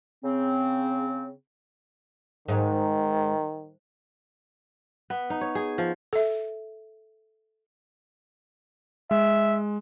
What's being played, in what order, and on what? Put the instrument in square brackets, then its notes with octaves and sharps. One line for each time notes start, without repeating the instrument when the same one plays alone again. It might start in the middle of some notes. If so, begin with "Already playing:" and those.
[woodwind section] C#3 C4
[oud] G#2 [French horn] D#3
[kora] B3
D#4
C#5
G#4
F3
[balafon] A4 E5
[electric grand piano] G#3 [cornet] E5